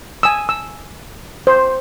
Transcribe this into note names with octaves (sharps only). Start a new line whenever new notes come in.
G#5 D#6 E6
E6
C5